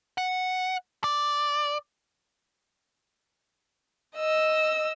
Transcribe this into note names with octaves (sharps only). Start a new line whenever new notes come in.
F#5
D5
D#5 E6